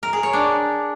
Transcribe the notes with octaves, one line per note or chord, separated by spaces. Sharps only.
A#4
G#4
C#5
D4